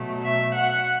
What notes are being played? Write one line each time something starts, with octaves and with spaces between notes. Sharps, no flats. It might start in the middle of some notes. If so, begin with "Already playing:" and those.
Already playing: B2 F#3 A3
E5
F#5